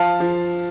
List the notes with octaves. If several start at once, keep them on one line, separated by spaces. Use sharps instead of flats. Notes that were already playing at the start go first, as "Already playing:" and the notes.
Already playing: F3 F5 A5
F3